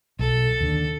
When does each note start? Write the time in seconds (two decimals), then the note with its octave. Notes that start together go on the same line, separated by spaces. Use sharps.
0.19 B1 A4
0.61 D#2 D3